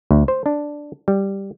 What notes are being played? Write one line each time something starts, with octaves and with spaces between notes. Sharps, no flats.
D2
C5
D4
G3